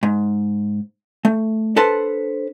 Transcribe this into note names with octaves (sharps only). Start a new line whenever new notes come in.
G#2
A3
D4 A4 B4 C5 A5